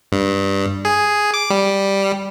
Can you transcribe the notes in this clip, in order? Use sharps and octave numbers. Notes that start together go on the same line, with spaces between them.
G2
G#4
D6
G3